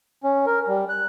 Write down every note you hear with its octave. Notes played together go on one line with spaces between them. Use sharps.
C#4
A#4
G3
F#6